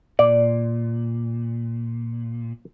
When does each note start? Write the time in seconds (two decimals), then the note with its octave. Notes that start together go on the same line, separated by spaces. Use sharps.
0.19 A#2 D5